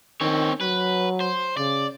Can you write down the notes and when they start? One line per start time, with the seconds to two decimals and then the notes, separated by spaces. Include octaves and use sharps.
0.21 D#3 C4 C#5
0.61 F#3 B4
1.20 C5
1.57 C#3 D5